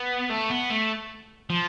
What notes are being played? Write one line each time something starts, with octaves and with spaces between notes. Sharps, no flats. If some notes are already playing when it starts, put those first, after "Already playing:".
Already playing: B3
A3
B3
A3
F3